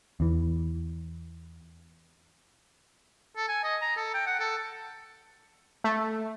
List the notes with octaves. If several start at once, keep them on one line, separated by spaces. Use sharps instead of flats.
E2 E3
A4
G#5
D#5
A#5
A4
G5
F#5
A4
A3